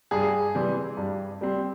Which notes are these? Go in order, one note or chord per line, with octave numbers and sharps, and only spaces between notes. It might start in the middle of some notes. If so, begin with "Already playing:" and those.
G2 G#4
E3 G3 C4
G2
G3 C4